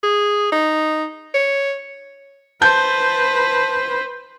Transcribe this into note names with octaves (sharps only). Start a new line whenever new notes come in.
G#4
D#4
C#5
B4 C5 A5 G6